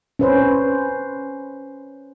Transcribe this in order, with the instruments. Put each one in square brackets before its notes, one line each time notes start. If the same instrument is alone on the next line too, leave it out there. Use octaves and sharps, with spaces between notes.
[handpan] C#4 B4 C5